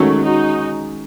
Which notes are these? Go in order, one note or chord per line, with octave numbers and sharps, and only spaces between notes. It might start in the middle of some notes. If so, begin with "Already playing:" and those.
Already playing: D#3 F#3 G#3 A3 C#4
D#4 F#4